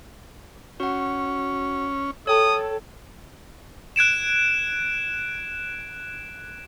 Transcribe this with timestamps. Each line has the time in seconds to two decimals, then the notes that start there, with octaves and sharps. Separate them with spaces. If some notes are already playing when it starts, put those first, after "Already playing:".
0.80 C#4 F#4 F#5
2.27 A4 C#5 G5 A5 D#6
3.96 F#6 G#6 D7 E7